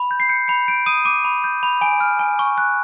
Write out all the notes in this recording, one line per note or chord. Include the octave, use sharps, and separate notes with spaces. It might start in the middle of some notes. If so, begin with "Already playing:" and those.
Already playing: B5
G6
C7
G6 C#7
B5 C#7
G6 D7
D#6 D#7
D6 D#7
B5
G6
B5
G#5 D7
F6
G#5
C#6
F#6